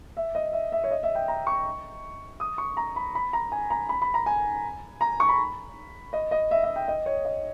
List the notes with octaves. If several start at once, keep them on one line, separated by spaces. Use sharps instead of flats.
E5
D#5
E5
E5
C#5
D#5
E5
G5
A#5
C#6
D#6
C#6
A#5
B5
B5
A#5
G#5
A#5
B5
B5
A#5
G#5
A#5
C#6
B5
D#5
D#5
E5
E5
G5
D#5
C#5
D#5